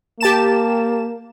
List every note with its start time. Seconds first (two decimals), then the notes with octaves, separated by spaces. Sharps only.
0.20 A#3 G4 A5 E7